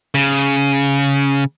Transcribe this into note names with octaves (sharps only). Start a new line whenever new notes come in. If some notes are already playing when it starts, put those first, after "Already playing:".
C#3